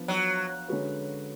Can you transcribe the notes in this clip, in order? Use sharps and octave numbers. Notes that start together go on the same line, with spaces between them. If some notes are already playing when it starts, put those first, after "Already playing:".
Already playing: F3 B3 D4 B4
F#3
D3 G#3 C#4 F#4 B4